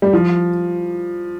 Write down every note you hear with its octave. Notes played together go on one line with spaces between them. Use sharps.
G3
F3